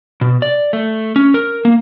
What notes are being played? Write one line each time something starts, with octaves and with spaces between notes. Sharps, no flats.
B2
D5
A3
C#4
A#4
A#3